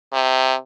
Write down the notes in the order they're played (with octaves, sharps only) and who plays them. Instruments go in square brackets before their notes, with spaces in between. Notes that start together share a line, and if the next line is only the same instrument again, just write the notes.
[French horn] C3